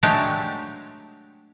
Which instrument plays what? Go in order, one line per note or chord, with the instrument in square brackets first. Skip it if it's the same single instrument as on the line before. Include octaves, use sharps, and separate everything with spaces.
[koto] F#3 G#3 A3 D4 G4 C#5